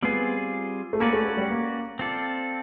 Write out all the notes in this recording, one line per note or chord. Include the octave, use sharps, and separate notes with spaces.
G3 B3 C4 F4 G#4
A3
A#3 C#4 F#4 B4 D5
A3
A3
G3
A#3
C4 F4 A4 D5